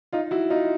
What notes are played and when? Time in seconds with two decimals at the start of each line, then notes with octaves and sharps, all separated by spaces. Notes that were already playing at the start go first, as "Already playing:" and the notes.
0.12 D#4 F4
0.31 E4 F#4
0.50 D#4 F4